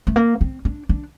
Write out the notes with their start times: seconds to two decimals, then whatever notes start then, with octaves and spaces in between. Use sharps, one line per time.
0.07 A3
0.16 A#3
0.41 C4
0.65 D4
0.89 D4